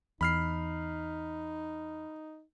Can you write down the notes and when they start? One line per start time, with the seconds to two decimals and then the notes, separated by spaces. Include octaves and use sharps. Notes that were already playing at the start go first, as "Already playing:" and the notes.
0.21 E2 D#4 B5 F6 C7